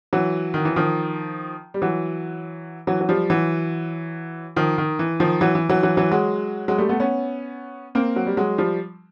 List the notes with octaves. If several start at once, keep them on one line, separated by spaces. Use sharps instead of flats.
E3 F#3
D#3
E3
D#3 F3
G3
E3 F#3
E3 F#3
F#3
F3 G3
E3 F#3
D#3 F3
D#3
E3
D#3 F3
E3 F#3
E3
E3 F#3
E3 F#3
E3 F#3
F#3 G#3
F#3 G#3
G3 A3
A3 B3
B3 C#4
A#3 C4
F#3
G3
F#3 G#3
F3 G3